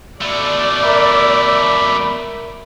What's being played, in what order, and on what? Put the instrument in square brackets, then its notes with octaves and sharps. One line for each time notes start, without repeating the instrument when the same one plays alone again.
[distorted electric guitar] B2 A3 [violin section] D5
[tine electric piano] A#4 E5 [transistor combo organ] B5 D6